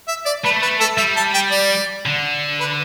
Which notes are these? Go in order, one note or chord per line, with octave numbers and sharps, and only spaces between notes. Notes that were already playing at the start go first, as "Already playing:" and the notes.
E5
D5
A3 B4
B4
A4
G3 E5
A5
G5
D5
D3
B4